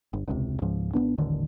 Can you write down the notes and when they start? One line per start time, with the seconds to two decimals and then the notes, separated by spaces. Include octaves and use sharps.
0.13 G1
0.28 E1 C#2 C3
0.62 C#2 G#2 F3
0.94 G#1 G2 B3 D4
1.18 D#1 A1 D3 D#3